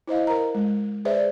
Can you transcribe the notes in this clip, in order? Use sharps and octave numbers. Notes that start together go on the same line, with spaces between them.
E4 C5 D#5 F5
A#4 A#5
G#3
G#4 B4 C5 D5 E5